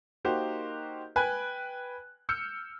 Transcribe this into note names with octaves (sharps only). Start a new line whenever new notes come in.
A#3 D#4 F#4 G4 A#4 C5
B4 G5 G#5 B5 F#6
E6 F6 G6 C#7